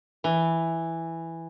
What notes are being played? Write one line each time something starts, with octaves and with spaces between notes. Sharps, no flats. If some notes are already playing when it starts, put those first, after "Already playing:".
E3